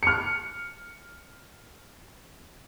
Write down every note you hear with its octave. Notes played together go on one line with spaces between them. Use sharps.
F6 C#7